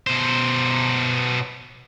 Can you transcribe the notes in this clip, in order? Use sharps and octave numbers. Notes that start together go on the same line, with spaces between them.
B2 C5